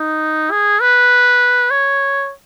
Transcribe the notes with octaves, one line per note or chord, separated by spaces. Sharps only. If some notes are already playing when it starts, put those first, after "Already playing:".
Already playing: D#4
G#4
B4
C#5